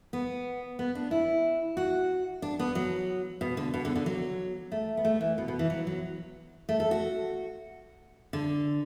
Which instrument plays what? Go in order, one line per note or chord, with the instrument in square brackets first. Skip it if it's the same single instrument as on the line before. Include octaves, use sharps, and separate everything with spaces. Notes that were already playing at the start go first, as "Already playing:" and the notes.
[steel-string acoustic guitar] B3
B3
D4
E4
F#4
D4
B3
F#3
B2
D3
B2
D3
D3
F#3
A3
B3
A3
E3
B2
B2
E3
F#3
F#3
A3
A4
F#4
D3